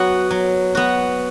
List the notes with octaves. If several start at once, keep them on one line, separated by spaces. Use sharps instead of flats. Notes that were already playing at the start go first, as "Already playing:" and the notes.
Already playing: F#3 B3 F#4
F#3
B3 F#4